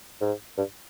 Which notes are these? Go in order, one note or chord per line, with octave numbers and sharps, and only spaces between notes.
G#2
G2